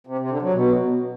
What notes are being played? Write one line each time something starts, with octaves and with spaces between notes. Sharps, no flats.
C3
C3
D3
F#3
B2